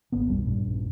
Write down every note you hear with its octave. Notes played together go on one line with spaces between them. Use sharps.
G#1 A#3 B3
F#1 B1 G3
A#1 G2